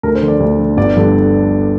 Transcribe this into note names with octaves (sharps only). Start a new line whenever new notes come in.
D2 A#4
C5
D3
D5
D2
D3
G1 D5
G2 D3